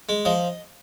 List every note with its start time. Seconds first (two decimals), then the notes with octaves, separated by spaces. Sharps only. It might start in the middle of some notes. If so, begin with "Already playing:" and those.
0.09 G#3
0.25 F3 D#5